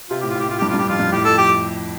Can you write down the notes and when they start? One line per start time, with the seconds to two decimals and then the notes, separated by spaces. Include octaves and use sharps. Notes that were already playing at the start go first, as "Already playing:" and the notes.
0.10 C3 F4
0.21 A2 G4
0.29 F4
0.35 A2
0.40 G4
0.49 A2 F4
0.59 G2 G4
0.69 G2 F4
0.79 G4
0.87 F2 F4
1.00 G2
1.12 A2 G4
1.25 F2 A4
1.38 G4